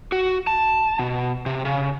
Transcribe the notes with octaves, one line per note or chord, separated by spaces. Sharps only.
F#4
A5
B2
C3
C#3